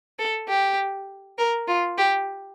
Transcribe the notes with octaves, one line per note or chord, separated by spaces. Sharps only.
A4
G4
A#4
F4
G4